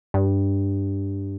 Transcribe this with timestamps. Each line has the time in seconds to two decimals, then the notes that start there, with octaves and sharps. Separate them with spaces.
0.14 G2